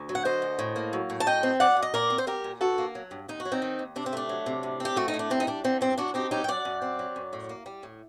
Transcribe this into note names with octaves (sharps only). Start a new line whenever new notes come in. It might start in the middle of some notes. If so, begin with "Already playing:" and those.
Already playing: D2
F#3
F#5
D3 C5 D#5
D2
A2
A#3
F#3
A2
A5
F#2 D#5 G5
C4
F#3 D5 F#5
F#2
D#5
A#2 A#4 D5
C4
C5
G3 G4 A#4
A#2
G2 F#4 A4
A#3
F#3
G2
D#2 D#4
F#4
F#3
C4 D#4
D#3
D#2
C3 D4
C4
A3 D4
F#3
C3
A2
C4 G4
A3 F#4
D#4
A2
D4
G2 C4
D#4
G3 D4
D3 C4
G2 C4
F#2 D4 F#4
C4 D#4 G4
F#3 D#4 G4
G5
F#2 D5 F#5
F#2
C4
F#3
F#2
A2
A#3
G3
A2